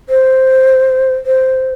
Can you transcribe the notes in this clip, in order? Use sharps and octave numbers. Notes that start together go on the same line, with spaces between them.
C5
C5